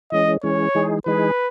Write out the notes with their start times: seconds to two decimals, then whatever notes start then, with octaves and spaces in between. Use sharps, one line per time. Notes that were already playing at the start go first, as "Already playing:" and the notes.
0.12 E3 G#3 C#4 D#5
0.43 E3 G#3 C#4 C#5
0.75 E3 G#3 D#4 G#4
1.06 E3 G#3 D#4 G#4 B4